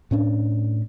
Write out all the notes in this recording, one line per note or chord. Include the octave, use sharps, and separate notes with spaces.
A2 C#4 D4